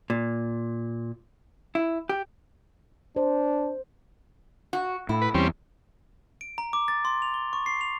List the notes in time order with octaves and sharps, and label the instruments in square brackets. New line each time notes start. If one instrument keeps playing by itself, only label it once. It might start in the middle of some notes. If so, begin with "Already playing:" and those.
[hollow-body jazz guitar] A#2
E4
G4
[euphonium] D4 [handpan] C5
[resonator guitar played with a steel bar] F#4
[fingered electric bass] A2 [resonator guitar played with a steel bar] E4
[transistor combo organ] B4
[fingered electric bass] E2 [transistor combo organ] G3 C4 C#4
[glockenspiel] D7
A#5
D6
A6
C6
F7
G7
C#6
C7
F7